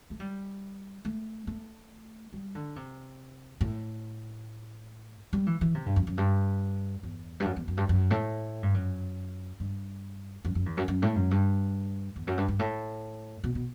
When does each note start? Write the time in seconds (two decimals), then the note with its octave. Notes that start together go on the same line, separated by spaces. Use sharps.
0.10 A3
0.20 G3
1.05 A3
1.47 A3
2.33 G3
2.55 D3
2.76 C3
3.61 A2
5.33 G3
5.46 E3
5.61 E3
5.75 C3
5.86 G2
5.96 F#2
6.07 F#2
6.17 G2
7.03 E2
7.40 G2
7.45 F#2
7.56 E2
7.68 F#2
7.77 G2
7.89 F#2
8.11 A2
8.63 G2
8.74 F#2
9.60 G2
10.45 F#2
10.55 F#2
10.66 E2
10.77 F#2
10.88 F#2
11.02 A2
11.16 F#2
11.31 G2
12.16 E2
12.27 F#2
12.37 G2
12.48 G2
12.59 A2
13.44 B2
13.55 B2